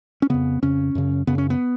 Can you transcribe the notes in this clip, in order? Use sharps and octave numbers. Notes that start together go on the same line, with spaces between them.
C#4
F2 C#3 B3
F2 C#3 C#4
F#2 C#3
F#2 C#3 B3
C#4
B3